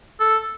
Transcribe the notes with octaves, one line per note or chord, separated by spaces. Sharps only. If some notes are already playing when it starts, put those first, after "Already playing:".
A4